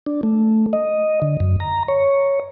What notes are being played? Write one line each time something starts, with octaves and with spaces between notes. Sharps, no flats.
D4
A3
D#5
D3
F#2
A#5
C#5